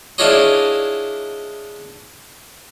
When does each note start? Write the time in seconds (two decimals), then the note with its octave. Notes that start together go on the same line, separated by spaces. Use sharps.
0.18 D4 E4 F4 G#4 C#5 D#5